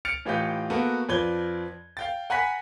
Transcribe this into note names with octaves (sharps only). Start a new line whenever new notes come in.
F6 A6 C#7 D7 F7
A2 E3 F4 G4 D#5 G6
A#3 B3 F#4 A4
F2 F3 B4 D5 G#6 G7
F5 G5 A6
F#5 G#5 A#5 B5 F#6 B6